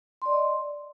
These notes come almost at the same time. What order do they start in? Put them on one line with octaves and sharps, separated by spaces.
C6 D5 D#5